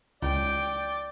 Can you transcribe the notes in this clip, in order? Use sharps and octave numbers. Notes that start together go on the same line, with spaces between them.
C#2 D5 G5